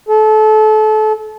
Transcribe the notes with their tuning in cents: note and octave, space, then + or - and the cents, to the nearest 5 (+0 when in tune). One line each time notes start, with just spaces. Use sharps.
A4 -30